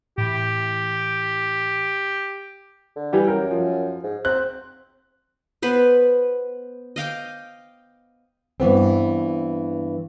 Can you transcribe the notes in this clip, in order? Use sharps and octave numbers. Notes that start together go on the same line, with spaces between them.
A2 E3 G4
D3
E3 G3 G4
F#2 A#4
F3
G#2
C4 F#6
B3 B4 C5
D#5 F5 G5 D6
G2 E3 B3 C4